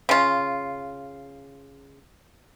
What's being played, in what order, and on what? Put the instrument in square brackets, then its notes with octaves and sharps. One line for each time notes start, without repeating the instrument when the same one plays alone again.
[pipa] C#3 F4